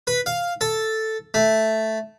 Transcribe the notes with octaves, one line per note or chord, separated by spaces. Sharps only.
B4
F5
A4
A3